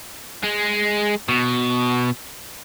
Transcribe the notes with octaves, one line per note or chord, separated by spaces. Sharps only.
G#3
B2